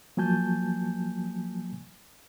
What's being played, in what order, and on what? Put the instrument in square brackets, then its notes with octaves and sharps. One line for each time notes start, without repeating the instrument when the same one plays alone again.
[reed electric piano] F3 F#3 A#3 G#5 A5 G6